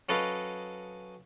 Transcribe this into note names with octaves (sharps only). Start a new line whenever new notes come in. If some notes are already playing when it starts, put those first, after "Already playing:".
F#3 C#4 A4 B4 D#5 F5